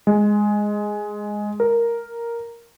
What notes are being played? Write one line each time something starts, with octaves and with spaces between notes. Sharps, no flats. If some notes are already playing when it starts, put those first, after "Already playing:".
G#3
A#4